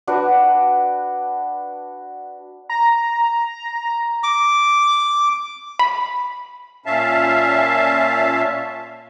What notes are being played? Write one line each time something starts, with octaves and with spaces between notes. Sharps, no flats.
D4 F#4 B4
A#5
D6
B5
A#2 C#4 E5 F5 A5